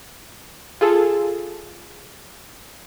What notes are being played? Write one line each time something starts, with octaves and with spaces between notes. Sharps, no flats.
F4 G#4 A4